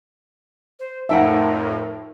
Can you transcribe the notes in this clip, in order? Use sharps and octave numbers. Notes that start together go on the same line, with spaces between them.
C5
F2 A2 D#4 A#4 E5 F#5 G5 A5